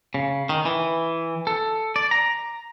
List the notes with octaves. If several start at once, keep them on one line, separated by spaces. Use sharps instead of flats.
C#3
D#3
E3
A4
D5
A#5